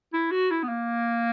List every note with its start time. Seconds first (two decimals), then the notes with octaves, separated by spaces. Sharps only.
0.13 E4
0.31 F#4
0.51 E4
0.63 B3
0.69 A#3